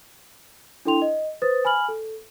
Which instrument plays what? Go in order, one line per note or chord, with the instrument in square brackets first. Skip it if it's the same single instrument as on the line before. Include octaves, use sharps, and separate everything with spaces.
[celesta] D4 E4 A4 G5 C6 F7
D#5
B4 C5 D#6 A6
G#5 B5 F6 F#7
A4